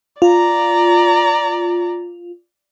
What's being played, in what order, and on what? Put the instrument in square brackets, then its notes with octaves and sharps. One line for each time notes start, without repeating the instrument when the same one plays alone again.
[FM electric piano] F4 [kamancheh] D5 A#5